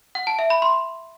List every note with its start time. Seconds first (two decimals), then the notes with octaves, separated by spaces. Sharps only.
0.15 F#5
0.27 A5
0.39 E5
0.50 B5
0.62 C6